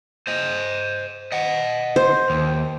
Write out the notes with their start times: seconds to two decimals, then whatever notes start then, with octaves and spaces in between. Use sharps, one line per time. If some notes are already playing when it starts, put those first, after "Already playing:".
0.27 C5 D#5
1.32 D#5 F#5
1.96 C5
2.30 D#2